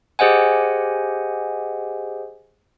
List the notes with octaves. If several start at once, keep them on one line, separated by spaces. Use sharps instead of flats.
G4 G#4 C5 D#5 F#5 G#5